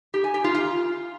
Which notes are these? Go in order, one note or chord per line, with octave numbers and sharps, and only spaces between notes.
G4
G#5
G4
F4
F4